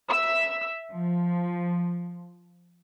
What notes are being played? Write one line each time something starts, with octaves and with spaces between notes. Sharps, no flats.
E5 E6
F3